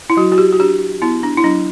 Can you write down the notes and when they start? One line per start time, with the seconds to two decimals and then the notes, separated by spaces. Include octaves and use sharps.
0.10 E4
0.17 F#3 F#4
0.32 F#4
0.38 G4
0.53 F#4
0.60 D4 G4
1.02 B3 E4
1.23 D4
1.37 E4
1.44 F#3 D4